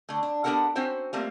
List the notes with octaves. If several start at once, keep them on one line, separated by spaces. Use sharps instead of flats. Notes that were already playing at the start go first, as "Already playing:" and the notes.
D3 A3
D4
B3 D4 G4 A4 A#4 F#5
C4 C#4 F#4 C5 G5
G3 A3 A#3 C4 F4